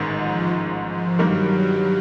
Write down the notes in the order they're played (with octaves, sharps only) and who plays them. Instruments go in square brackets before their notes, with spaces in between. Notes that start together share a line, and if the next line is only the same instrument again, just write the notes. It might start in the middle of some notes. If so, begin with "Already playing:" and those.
Already playing: [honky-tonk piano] A1 G#2 D#3
[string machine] F3
F3
[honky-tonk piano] G2 D#3 G3 A#3 [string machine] F#3